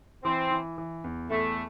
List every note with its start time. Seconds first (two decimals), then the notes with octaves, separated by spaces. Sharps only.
0.24 E3 C4
0.51 E3
0.78 E3
1.04 E2
1.30 E2 A3